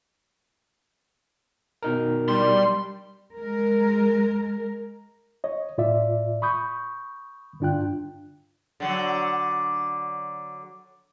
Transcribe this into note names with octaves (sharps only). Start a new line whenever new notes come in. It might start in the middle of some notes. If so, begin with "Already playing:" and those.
B2 D#4 A#4
G3 D4 C6
G#3 A#4
C#5 D#5
A2 F4 D5 E5
B5 C#6 D#6 G6
G2 D3 D4 F4 G5 F#6
D3 F#3